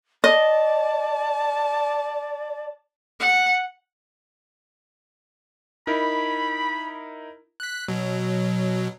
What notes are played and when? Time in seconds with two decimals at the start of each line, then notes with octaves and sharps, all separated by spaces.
0.24 D5 D#5 A5
3.20 F#5
5.87 D#4 E4 A#4 B5
7.60 F#6 B6
7.88 B2 F#3